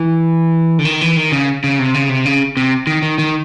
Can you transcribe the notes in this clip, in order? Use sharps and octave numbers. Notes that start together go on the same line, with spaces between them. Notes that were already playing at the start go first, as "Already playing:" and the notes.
Already playing: E3
D3
D#3
E3
D#3
C#3
C#3
C3
C#3
C3
C#3
C3
D#3
D#3
D#3